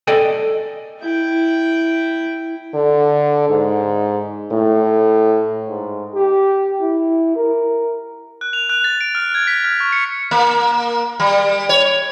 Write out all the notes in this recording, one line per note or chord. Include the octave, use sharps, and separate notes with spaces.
A4 D5 D#5 G5 G#5
E4 G5
D3
G#2
A2
G#2
G4
E4
A#4
F#6
F7
F#6
A6
D7
F6
G#6
B6
F6
C#6
C#7
A#3
G3
C#5